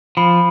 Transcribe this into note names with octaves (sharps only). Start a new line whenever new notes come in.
F3 B5